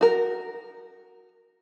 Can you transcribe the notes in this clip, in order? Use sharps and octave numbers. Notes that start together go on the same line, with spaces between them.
F#4 A#4